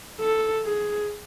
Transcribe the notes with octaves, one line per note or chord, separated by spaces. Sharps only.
A4
G#4